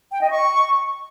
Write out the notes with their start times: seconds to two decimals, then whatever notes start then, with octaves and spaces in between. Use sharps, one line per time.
0.12 G5
0.21 D#5
0.31 C#6